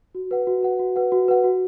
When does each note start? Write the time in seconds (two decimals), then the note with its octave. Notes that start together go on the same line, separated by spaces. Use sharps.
0.15 F#4
0.31 B4 F#5
0.47 F#4
0.63 B4 F#5
0.79 F#4
0.96 B4 F#5
1.12 F#4
1.28 B4 F#5
1.44 F#4